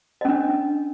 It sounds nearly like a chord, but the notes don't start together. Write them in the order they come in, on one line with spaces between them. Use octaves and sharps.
D#5 C#4 D4